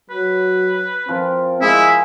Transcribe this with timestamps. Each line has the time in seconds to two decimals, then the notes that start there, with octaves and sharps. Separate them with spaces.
0.10 F#3 B4
1.08 F3 C4 A#4
1.61 G#3 E4 F5 G#5 D#6